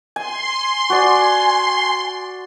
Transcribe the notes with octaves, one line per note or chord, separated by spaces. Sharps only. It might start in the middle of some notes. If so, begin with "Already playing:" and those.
G#5 C6
F#4 D5 G#5